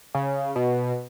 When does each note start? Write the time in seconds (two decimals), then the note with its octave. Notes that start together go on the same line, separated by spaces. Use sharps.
0.15 C#3
0.56 B2